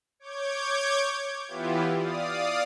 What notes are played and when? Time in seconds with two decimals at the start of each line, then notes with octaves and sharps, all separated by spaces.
0.20 C#5 D6 G6 G#6
1.48 E3 B3 E4 F4 G4
1.93 D5 F5 D#6